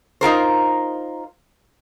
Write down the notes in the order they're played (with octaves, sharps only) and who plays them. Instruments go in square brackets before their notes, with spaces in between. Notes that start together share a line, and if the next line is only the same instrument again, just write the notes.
[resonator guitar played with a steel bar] D#4 F4 A#4 C5